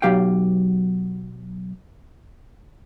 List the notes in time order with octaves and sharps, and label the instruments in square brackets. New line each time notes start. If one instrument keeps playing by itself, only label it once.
[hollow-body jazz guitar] B1 F#2 F#3 G4 F5 G5